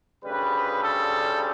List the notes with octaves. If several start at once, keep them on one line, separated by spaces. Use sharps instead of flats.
D2 C#3 G3 B4
A4